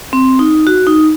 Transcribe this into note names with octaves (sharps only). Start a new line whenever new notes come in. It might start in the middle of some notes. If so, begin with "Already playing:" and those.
C4
D#4
F#4
D#4